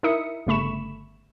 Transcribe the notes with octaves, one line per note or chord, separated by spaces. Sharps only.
D#4 E4 A#4 E5 D#6 C#7
G1 C#3 A3 B5 C#6 E7